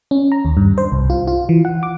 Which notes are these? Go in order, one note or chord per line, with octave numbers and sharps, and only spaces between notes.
C#4
A#5
D#2
G2
C5
C2
F4
F4
E3
F#5
D6